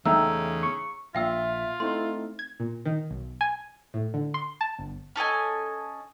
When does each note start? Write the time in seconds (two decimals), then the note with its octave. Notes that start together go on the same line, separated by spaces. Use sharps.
0.06 E2 C#3 A3 D#4 E5 G5 A#5 E6
0.63 C#6
1.15 A#1 A#2 F4 E5 F5 G5 E6
1.80 A3 C4 D#4 E4 C6
2.39 G#6
2.60 A#2
2.86 D#3
3.11 B1
3.41 G#5
3.94 A2
4.14 D3
4.34 C6
4.61 A5
4.79 G1
5.16 C#4 A4 D#5 G#5